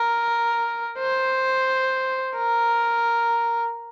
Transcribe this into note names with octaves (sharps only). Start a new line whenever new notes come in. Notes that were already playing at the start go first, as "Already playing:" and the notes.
Already playing: A#4
C5
A#4